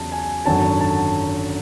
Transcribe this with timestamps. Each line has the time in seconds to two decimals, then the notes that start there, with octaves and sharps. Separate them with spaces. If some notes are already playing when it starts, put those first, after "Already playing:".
Already playing: E2 C#3 F#3 A5
0.12 G#5
0.46 G#1 F#2 D3 F#3 A5
0.81 A5